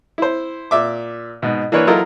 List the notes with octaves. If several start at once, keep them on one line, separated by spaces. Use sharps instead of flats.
E4 C5
A#2 E5 D6
G#2 B2
E3 A#3 D4 A#4 B4 C#5
F#3 E4 F4 A4 A#4 D#5